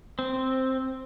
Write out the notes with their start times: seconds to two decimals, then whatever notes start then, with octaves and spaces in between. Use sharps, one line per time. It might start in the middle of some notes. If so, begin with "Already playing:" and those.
0.19 C4